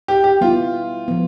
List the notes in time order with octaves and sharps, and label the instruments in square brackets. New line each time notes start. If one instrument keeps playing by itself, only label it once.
[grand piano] G4
G4
[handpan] G3 B3 E4 [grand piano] F4
[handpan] F3 B3